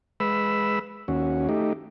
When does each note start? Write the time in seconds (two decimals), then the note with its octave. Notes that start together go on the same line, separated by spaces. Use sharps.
0.20 G#3 B4 B5 E6
1.08 D#2 C#4 F#4
1.49 A3 D#4 G4